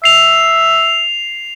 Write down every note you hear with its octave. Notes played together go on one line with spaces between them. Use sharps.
E5 C7 F7